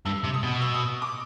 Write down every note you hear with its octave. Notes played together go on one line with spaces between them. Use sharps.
G2 E6
C3
D#6
B2
E6
D#6
D6